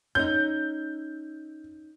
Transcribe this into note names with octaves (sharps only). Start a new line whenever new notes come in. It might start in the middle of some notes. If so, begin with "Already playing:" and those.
C#4 D#4 G6